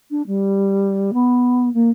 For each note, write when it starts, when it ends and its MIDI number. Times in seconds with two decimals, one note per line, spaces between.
0.10 0.22 62
0.27 1.11 55
1.13 1.71 59
1.73 1.90 58